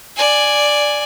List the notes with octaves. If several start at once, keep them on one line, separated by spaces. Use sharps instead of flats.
D5 G#5